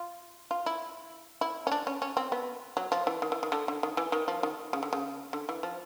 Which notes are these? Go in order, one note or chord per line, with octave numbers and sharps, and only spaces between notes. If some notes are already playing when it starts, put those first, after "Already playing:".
Already playing: F4
F4
E4
E4
C#4
D4
C#4
C#4
C4
B3
F#3
F3
E3
D#3
E3
D#3
D3
D3
D#3
E3
D#3
F3
D#3
C#3
D3
C#3
D3
E3
F3